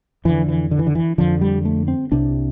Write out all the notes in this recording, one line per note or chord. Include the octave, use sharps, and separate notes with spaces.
F2 D3 E3
E3
D3
E3
D3
E3
F2 D3 F3
G3
A3
C4
C2 C3 D4